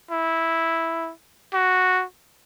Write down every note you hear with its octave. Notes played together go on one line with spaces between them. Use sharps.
E4
F#4